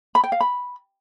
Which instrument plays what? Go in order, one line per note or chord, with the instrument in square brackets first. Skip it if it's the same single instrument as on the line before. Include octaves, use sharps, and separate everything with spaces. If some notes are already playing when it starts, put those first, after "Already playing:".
[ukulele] B5
G5
F5
B5